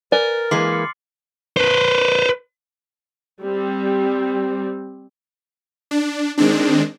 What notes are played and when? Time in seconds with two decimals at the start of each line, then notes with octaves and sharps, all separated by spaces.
0.12 A#4 B4 D5 G#5 F6 A6
0.51 E3 G#3 A#3 C6 D6 C7
0.68 C7 C#7
1.57 B4 C5
3.42 G3 C4
5.91 D4
6.38 D#3 G#3 C4 D4